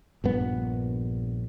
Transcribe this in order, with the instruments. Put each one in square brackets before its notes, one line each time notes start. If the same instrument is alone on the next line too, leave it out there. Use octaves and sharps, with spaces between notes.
[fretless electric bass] A#1 G2 B3